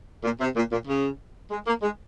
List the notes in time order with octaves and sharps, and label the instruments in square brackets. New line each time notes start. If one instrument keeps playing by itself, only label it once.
[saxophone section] A#2
C3
A#2
A#2
C#3
G#3
A#3
G#3